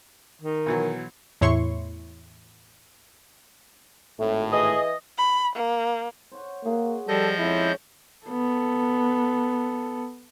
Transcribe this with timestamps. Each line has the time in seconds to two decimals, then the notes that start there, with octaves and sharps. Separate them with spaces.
0.42 D#3
0.66 B1 E3 F#3
1.41 E2 A2 E4 C#5 C6 C#6
4.19 G#1 A2 A3
4.52 E3 G#4 D#5
5.18 B5
5.56 A#3
6.32 C5 C#5 F#5
6.65 A#3 F#4 G#4
7.08 F3 G3 A4 D#5 G6
7.39 F2 G#3 C#4 E4
8.27 B3 A4